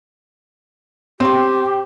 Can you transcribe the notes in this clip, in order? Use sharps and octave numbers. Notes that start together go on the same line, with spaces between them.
C4 G4 C6